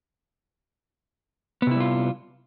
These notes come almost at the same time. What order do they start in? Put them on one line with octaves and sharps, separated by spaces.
B3 C3 E4 G3 F4